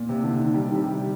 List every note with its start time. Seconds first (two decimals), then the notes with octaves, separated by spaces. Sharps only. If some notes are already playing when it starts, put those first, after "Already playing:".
Already playing: A#2
0.09 C3
0.24 D3
0.39 D#3
0.54 G3
0.64 D#3
0.74 C3
0.84 G3